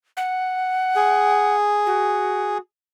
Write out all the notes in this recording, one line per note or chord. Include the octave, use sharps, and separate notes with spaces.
F#5
G#4
F#4